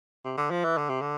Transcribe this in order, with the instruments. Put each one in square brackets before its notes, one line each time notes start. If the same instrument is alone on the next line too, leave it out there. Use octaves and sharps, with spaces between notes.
[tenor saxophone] C3
D3
F3
E3
D3
C3
D3